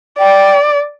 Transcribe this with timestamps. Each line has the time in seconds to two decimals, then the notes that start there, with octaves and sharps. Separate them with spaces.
0.19 D5 G5